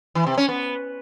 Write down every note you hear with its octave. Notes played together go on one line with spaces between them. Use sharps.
E3
C3
C#4
B3